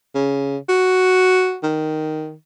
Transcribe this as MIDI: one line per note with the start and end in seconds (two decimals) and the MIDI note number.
0.14 0.57 49
0.69 1.57 66
1.63 2.33 51